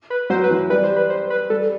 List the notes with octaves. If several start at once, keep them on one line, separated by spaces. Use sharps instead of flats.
B4
F#3 C5
B4
E3
G3 B4
C5
B4
C5
B4
G3 A4